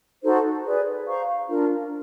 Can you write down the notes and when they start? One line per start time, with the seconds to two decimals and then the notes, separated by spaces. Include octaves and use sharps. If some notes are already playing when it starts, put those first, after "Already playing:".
0.22 D#4 F#4 A4 C5
0.65 G#4 B4 D5
1.07 C5 F5 A#5 C#6
1.49 D4 F4 A#4